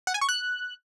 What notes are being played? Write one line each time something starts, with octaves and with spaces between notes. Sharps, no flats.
F#5
G#5
C#6
F#6